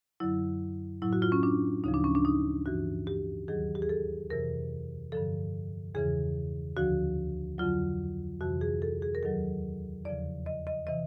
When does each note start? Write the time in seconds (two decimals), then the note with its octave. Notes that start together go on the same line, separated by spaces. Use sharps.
0.20 F#2 D3 F#3 E4
1.02 A2 F#3 E4
1.13 F#4
1.22 F4
1.32 C#4
1.43 D4
1.84 D2 C#3 F3 D#4
1.94 D4
2.04 C#4
2.15 D4
2.25 D#4
2.66 G2 E3 F#4
3.07 G4
3.48 D#2 D#3 F#3 G#4
3.75 G4
3.82 G#4
3.89 A4
4.30 F2 C3 E3 A#4
5.12 G2 D3 F3 A4
5.95 E2 C#3 E3 G#4
6.77 D2 D3 F3 F#4
7.58 F2 D3 F#3 F4
8.41 F2 C3 E3 F#4
8.61 G#4
8.82 A4
9.02 G#4
9.15 A#4
9.23 D#2 D#3 F#3 A4
10.05 E2 C#3 F3 D5
10.46 D#5
10.67 D#5
10.87 C3 E3 D#5